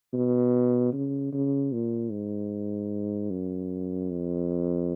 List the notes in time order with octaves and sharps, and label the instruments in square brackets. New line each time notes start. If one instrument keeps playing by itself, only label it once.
[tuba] B2
C#3
C#3
A#2
G#2
F#2
F2